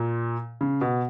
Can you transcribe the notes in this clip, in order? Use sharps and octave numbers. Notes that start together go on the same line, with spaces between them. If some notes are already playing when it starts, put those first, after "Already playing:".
Already playing: A#2
C#3
B2